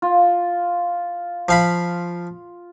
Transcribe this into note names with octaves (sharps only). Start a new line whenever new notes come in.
F4
F3 F5 B5